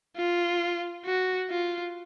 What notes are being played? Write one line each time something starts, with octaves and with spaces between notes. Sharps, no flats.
F4
F#4
F4